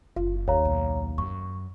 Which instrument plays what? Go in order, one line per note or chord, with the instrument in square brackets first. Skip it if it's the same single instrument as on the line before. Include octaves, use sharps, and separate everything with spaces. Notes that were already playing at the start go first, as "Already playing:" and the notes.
[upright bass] F#1 [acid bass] F4
[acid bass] D#2 [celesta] C#5 F5 A#5
[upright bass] B1
[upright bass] F#2 [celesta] C#6